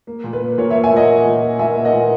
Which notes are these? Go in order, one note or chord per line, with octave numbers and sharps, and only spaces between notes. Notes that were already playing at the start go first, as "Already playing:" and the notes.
A#3
A#2
B4
A#3
A#2 A#4 C#5
A#3 C#5 E5
E5 G#5
A#2 D#5 F#5
A#3
A#2
A#3
A#2 E5 G#5
A#3
D#5 F#5
A#2